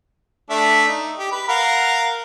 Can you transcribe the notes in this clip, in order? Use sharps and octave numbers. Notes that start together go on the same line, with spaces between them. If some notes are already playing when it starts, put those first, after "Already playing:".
A3 D4 E5
D#4
G4
B4
A#4 F5 F#5